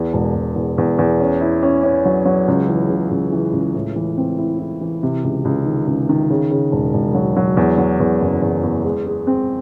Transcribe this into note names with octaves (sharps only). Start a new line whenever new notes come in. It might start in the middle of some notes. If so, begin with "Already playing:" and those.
Already playing: E2
E1
E1
E2
E2
E2
C#4
E4
C#4
C#4
F#3
F#3
C#2
E3
C#3
C#2
E3
C#2
A2
E3
C4
E4
E4
E3
C3
C#2
C#2
D#3
C#2
D#3
C#3
C#3
E1
E1
F#3
F#3
E2
F#3
E2
F#1
E2
E2
G#3
G#3
C4